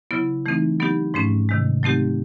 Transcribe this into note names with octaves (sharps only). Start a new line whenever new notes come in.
C#3 F#3 B3 E4
E3 A3 C4 D#4
F#3 B3 D#4 G4
G#2 F3 A3 C#4
C3 D#3 G#3
F#3 A3 C4 D#4 G4